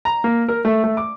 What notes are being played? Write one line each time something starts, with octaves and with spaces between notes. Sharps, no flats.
A#5
A#3
A#4
A3
A3
D6